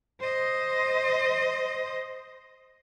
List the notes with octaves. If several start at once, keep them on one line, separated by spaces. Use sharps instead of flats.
C5 D#5